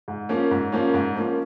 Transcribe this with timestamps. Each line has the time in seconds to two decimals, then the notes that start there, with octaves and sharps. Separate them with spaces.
0.08 G#2
0.29 F3 A#3 C#4
0.51 G#2
0.72 F3 A#3 C#4
0.94 G#2
1.15 F3 A#3 C#4